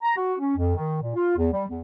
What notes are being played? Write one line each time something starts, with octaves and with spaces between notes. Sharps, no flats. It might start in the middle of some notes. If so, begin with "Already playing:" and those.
A#5
F#4
C#4
F2
D#3
A#2
F4
E2
G3
E2